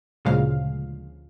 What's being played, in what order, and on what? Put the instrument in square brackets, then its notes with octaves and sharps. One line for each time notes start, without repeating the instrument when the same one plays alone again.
[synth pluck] D2 A#2 C#3 F3 G#3 F5